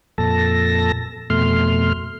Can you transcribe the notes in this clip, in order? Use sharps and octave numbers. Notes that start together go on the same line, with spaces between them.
F2 A#2 A4 A5 A#6
F2 B2 A3 C6 F6